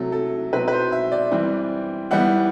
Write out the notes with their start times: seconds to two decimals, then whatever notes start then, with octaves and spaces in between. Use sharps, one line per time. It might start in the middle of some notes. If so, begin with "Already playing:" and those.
Already playing: C3 F#3 A3 A4
0.12 A4
0.53 B2 F#3 C4 B4
0.68 B4
0.72 C5
0.92 E5
1.12 D5
1.32 E3 G3 C4
2.11 E3 G3 B3 F#5